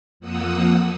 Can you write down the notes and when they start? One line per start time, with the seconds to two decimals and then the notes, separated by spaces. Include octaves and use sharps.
0.20 F2 F3 A#3 F#5 D#6 E6